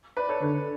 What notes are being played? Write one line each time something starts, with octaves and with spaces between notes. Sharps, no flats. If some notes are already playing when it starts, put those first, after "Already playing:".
B4 D5
A4 C#5
D3 B4